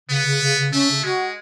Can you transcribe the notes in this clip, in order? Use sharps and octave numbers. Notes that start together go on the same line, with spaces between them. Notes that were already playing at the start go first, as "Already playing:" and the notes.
C#3 B3
C#3
C#3
C#3
A3 C#4
C#3
G#3 F#4